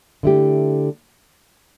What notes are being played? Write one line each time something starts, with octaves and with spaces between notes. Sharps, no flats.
D3 A3 E4 G4